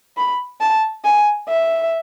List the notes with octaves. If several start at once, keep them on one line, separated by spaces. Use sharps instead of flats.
B5
A5
G#5
E5